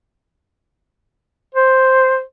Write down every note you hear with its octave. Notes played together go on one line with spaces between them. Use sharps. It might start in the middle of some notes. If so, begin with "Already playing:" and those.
C5